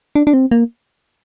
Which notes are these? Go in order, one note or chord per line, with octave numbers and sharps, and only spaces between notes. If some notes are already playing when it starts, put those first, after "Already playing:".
D4
D4
C4
A#3